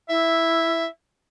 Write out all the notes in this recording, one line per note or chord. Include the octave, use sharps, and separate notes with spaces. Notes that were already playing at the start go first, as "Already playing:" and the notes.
E4 E5